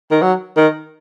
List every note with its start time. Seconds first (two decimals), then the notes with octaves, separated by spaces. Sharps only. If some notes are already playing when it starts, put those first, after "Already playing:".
0.11 D#3
0.22 F#3
0.57 D#3